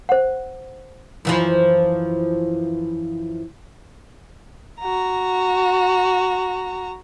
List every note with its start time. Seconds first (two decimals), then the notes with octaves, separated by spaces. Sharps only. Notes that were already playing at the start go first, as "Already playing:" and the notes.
0.09 C5 F#5
1.25 F#2 E3 F3
4.80 F#4 A#5